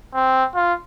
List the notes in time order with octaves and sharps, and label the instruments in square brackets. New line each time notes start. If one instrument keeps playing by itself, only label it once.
[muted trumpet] C4
F4